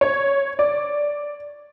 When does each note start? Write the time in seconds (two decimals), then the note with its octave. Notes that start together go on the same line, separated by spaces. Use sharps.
0.01 C#5
0.59 D5